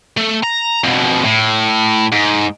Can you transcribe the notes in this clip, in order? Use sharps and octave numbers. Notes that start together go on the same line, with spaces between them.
A3
A#5
F2 B2
A2
G#2